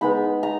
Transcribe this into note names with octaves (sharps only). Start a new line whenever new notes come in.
G#3 B3 D#4 B5
A#5